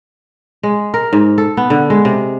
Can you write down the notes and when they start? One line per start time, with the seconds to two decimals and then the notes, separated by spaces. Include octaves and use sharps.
0.63 G#3
0.94 A#4
1.13 G#2
1.38 A4
1.57 B3
1.70 D3
1.90 G#3
2.05 C3